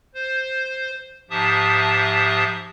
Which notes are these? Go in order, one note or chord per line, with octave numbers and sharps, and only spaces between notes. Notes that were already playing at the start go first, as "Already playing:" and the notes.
C5
G#2 F3 G4 E5 A5 D#6